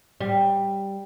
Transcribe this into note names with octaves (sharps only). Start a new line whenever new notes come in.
G3